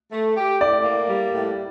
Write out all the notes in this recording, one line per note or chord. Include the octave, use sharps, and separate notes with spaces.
A3
G4
A2 D5
A#3
G3
A2